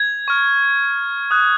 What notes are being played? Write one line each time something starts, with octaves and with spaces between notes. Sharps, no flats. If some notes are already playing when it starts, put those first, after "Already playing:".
Already playing: G#6
C#6 F6
D#6 F#6